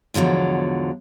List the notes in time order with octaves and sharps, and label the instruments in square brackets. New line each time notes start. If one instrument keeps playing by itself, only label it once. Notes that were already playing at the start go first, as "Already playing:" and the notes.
[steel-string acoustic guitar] E2 G#2 D3 F3 F#3